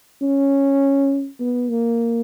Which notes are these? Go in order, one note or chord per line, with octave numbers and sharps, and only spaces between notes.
C#4
B3
A#3